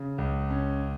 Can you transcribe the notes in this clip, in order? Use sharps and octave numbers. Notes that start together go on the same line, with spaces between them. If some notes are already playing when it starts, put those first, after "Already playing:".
Already playing: C#3
C#2
C#4